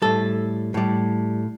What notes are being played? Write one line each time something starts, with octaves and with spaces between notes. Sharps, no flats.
A2 G3 A4
A2 G3